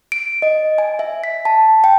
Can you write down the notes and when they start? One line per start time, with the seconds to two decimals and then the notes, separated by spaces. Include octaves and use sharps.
0.12 D7
0.42 D#5
0.78 G#5
0.99 E5
1.24 B6
1.45 A5
1.84 G5